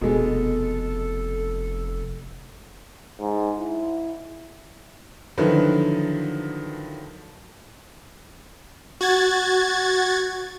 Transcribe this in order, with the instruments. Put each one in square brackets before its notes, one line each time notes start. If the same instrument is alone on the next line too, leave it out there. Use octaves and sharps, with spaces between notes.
[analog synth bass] F1 [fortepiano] B2 G#3 [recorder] A4
[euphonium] G#2
E4
[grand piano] D3 D#3 F3 F#3 E4 B4
[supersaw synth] F#4 G#6 A6